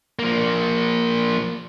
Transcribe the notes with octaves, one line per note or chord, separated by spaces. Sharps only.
F3 A#3